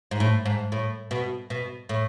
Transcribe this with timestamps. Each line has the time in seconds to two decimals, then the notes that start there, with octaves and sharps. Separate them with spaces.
0.11 G#2
0.20 A2
0.45 G#2
0.72 A2
1.11 B2
1.50 B2
1.89 A2